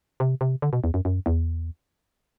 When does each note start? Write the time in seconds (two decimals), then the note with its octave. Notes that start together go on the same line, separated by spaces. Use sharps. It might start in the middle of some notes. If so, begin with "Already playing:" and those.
0.20 C3
0.41 C3
0.62 D3
0.73 B2
0.84 E2
0.94 F#2
1.05 F#2
1.26 E2